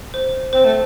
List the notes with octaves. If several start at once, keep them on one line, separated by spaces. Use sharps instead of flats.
C5
C4 C5
A3